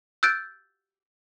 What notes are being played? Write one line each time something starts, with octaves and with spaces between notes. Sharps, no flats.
E6 F#6 G6 A6 D7